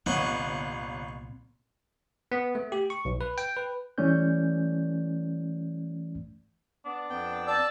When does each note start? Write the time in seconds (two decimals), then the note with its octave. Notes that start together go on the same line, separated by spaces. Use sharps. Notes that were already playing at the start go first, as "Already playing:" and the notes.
0.06 G1 C2 A#2 C4 C#5 D#5 F#5
2.32 B3
2.55 A3
2.72 G4
2.90 C#6
3.05 B1
3.21 B4
3.38 G5
3.57 B4
3.98 E3 G3 A3 C#4 D5 G6
6.85 B3 D4
7.10 F2 B3 G5
7.47 D5 A5 E6